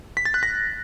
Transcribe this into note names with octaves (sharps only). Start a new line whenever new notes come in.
B6
A6
F#6
A#6